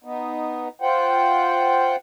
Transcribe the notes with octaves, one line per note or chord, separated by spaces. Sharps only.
B3 D#4
F4 C5 F#5 G5